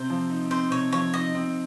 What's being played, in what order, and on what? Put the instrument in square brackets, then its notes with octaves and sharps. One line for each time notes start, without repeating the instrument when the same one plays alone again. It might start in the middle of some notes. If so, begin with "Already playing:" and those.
Already playing: [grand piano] C3 C4 [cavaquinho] C5
[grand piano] F3
D#4
[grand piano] C4 [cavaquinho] C5
[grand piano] C3 [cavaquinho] C#5
[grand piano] F3 [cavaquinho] C#5
[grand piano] D#4 [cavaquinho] D#5
[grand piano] C4